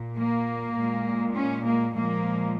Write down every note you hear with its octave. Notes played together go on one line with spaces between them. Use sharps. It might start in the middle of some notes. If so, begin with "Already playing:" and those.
Already playing: A#2
A#3
A#2 G#3
C#4
A#3
A#2 F3 G#3 A#3